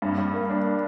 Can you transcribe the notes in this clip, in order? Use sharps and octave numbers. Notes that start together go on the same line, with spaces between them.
G2
G2
A#3
D4